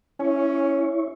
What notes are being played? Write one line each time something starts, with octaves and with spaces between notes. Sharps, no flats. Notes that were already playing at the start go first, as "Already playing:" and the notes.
C#4 E4 C#5